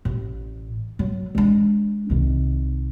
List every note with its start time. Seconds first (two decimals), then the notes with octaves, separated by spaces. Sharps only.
0.05 A1
0.99 F#3
1.35 G#3 D4
2.10 C2 D#3